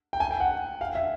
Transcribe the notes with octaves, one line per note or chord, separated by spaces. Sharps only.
G5
G#5
G5
F#5
F5
E5